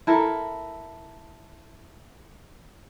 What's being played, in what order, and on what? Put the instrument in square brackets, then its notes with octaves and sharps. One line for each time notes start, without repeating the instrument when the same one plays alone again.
[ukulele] E4 A4 A#4